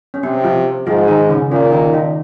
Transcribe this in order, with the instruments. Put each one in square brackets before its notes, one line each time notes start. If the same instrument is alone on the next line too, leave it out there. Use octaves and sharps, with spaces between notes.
[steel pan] C#4
[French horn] C3 [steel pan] C4
[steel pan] F3 F4
[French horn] G#2 [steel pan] F3 F4
[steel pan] D#3 D#4
C#3 C#4
[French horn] A#2 [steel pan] C#3 C#4
[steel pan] D#3 D#4
D#3 D#4